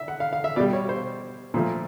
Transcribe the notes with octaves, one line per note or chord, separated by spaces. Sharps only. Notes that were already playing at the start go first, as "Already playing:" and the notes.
Already playing: E5
F#5
F5
F5
E5
B2 G3 D5
C#5
C5
A#2 F3 A3